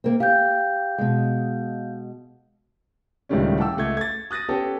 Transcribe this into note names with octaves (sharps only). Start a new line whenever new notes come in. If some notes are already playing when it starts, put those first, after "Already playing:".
A#3 C4
G4 F5 G6
B2 G#3
C#2 A2 D#3 G3 A3 C#4
F#5 G5 A5 D6 E6
C#2 A3 G#6
G#6 A6
D#6 F#6 A6 A#6 D#7
B3 C#4 G4 A4